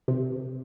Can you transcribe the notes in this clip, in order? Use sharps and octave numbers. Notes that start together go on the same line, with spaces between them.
C3